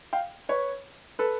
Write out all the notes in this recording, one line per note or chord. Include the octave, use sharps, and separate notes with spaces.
F5 G5
B4 C#5
A4 B4